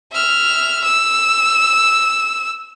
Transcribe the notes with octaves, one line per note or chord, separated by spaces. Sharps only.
E5 F6
E6